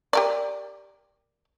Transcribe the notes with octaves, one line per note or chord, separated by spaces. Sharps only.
G4 A#4 D5